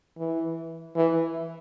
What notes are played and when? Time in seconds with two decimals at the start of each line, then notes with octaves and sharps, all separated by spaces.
0.18 E3
0.95 E3